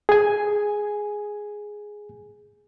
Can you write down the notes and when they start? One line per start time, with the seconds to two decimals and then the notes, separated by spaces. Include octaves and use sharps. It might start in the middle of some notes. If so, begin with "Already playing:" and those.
0.09 G#4 G#5